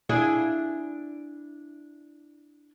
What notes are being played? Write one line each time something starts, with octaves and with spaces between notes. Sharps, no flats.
D4 E4 G#4